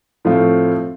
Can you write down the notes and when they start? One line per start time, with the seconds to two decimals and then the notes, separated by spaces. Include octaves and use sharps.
0.25 A2 F3 A3 C4 F4